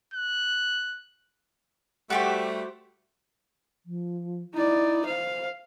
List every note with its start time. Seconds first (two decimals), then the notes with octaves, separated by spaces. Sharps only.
0.14 F#6
2.10 G3 A3 F#4 G4 C5
3.86 F3
4.54 D#4 E4 D5
5.06 C5 F5